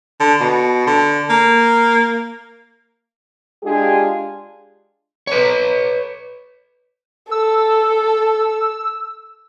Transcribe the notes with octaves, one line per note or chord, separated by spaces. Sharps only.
D3
B2
D3
A#3
G#3 D4 F4 G4 G#4
B4 C#5
A4 E6